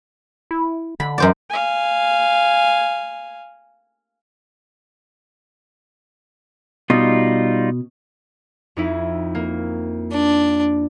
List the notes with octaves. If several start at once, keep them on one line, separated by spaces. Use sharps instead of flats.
E4
D3 B5
F#2 C5 D5
F5 G#5
B2 G3 D#4 F4
F2 D#4 E4
A#3
D4